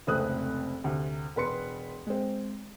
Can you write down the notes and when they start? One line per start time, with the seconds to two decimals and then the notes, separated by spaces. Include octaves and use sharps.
0.07 F1 C#2 A3 C4 D#6 F#6
0.84 D2 C3
1.36 E1 B4 C6 C#7
2.07 G#3 C4